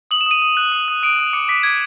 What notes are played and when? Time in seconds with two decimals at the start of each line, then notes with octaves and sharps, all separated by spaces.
0.11 D#6 F#7
0.21 E7
0.26 D#6 D#7
0.42 D#6
0.57 F#6
0.72 D#6
0.88 D#6
1.03 D#6 D7
1.19 D#6
1.33 D6 C#7
1.48 D6 B6
1.63 D6 G#6